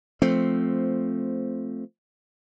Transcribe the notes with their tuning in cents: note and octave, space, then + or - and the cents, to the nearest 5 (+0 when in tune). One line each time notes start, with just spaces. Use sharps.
F3 +0 A3 +0 C4 +0